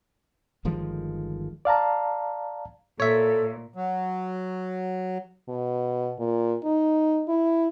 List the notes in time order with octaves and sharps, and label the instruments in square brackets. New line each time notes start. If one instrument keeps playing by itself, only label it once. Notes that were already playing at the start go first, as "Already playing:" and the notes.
[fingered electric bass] G1 D#3 F3 G#3
[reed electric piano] D5 F5 A5 A#5
[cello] A#2 [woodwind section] A4 [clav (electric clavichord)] C#5 E5
[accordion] F#3
[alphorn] B2
A#2
D#4
E4